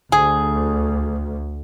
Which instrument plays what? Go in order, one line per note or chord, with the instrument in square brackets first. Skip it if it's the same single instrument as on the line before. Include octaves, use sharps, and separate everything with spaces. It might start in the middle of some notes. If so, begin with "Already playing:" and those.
[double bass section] D2 [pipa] G#4